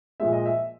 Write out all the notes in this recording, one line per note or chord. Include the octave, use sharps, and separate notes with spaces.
A#2 F3 G#3 E5
D#5
E5